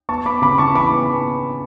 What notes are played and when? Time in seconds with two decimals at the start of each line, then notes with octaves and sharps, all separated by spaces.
0.09 B3 A5 C#6
0.25 B3 B5 D6
0.42 C#3 B5 D6
0.58 C#3 A5 C#6
0.75 E3 B5 D6
0.92 B3